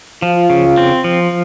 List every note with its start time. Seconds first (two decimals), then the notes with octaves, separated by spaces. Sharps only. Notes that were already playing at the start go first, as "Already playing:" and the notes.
0.22 F3 F4
0.50 C#3
0.78 C4
1.04 F3